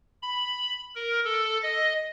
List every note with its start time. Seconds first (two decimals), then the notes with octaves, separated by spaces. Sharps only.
0.23 B5
0.95 A#4
1.25 A4
1.63 D#5